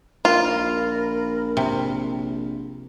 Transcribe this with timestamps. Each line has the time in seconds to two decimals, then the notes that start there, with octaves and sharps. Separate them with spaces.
0.25 A#1 F4 A#4 B5
1.57 C3